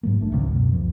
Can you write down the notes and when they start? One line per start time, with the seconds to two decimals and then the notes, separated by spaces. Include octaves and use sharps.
0.03 G#2 F#3 A#3
0.20 A1 A3 D4
0.32 G#1 C#2 C3
0.52 F#2 B2
0.73 C#2 F3